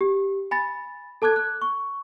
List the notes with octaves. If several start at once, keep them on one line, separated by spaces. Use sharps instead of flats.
G4
G#5 B5 A6 A#6
A4 A5 D6 F#6 G#6
F#6
C#6